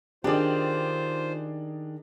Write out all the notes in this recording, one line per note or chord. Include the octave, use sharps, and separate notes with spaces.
D#3 D4 F4 G4 G#4 C5 D5